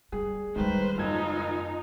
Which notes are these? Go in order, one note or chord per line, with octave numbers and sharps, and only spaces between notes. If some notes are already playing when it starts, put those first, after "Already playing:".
G3 G#4
D#3 G3 G#3 B4 C5
F#1 D#4 F4 G#6